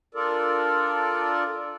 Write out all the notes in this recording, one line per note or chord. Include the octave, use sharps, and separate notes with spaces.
D4 F4 A4 A#4 D5